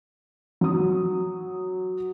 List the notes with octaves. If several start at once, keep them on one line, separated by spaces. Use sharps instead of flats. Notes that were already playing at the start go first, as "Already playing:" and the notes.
F#3 D#6